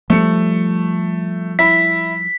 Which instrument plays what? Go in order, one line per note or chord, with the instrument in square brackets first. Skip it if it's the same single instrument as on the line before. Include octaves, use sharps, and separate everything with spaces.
[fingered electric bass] F3 G3 [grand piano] A3 C#7
[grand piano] E4 B5 [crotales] B6